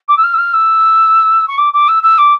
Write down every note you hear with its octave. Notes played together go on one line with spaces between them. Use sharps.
D6
E6
F6
E6
F6
E6
C#6
D6
D6
E6
E6
D6